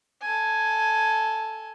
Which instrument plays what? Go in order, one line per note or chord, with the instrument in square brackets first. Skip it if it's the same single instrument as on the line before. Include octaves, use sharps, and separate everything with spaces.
[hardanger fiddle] A4 G#5